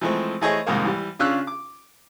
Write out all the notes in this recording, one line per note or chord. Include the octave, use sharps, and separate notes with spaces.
E3 F3 G#3 A3 C4
E3 A3 G#4 C5 C#5 D#5
C2 F2 G#2 D#3 G#3 A#3
E3 G3
C#3 C#4 D4 F4 E6 F#6
D6